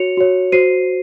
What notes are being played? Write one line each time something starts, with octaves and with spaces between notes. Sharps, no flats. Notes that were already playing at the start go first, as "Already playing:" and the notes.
Already playing: F#4 C#5 C#7 F7
F#4 C#5
F#4 C5 C7 D#7